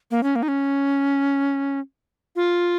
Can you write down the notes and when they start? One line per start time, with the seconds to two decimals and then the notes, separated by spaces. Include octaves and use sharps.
0.11 A#3
0.23 C#4
0.36 A#3
0.43 D#4
0.48 C#4
2.36 F4